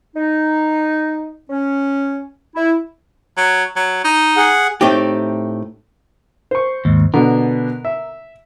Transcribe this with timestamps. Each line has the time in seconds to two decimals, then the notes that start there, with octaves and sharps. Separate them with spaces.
0.15 D#4
1.50 C#4
2.56 E4
3.37 F#3
3.76 F#3
4.04 D#4
4.37 G#4 F#5
4.81 A2 A3 C4 D#4 G4
6.51 C5 C#6
6.85 D#2 G#2
7.14 B2 D3 B3 A#4
7.85 E5